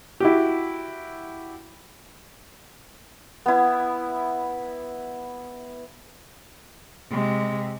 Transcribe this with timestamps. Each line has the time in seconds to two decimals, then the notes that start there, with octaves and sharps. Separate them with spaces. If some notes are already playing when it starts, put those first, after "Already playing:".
0.20 E4 F#4 G4
3.46 B3 E4
7.10 C3 G#3